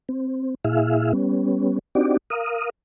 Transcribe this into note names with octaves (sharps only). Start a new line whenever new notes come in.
C4
A#2 E4 G#4 E5 F5
G3 B3 C#4
C4 D4 D#4 F#4 G4 D5
A#4 F5 D#6